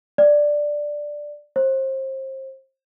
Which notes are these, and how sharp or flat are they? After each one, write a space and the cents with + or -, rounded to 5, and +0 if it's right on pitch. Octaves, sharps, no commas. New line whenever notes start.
D5 +5
C5 +30